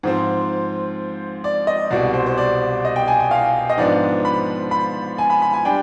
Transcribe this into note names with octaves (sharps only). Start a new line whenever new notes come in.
G#2 F3 C4
D5
D#5
C2 B2 G3 D5
C5
C5
D5
D#5
G5
G#5
G#5
F5
D#5
G#2 F3 B3 D4 D5
B5
B5
G#5
B5
B5
G#5
G3 D4 G5